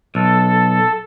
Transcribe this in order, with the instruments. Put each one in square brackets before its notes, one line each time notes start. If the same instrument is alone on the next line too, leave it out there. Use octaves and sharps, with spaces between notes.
[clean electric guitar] B1 [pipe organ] A4